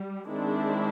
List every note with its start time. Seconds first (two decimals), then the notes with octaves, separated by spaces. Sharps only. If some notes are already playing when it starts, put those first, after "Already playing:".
Already playing: G3
0.27 D#3 G#3 C4 D4 E4